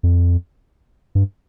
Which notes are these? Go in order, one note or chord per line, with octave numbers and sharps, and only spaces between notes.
F2
G2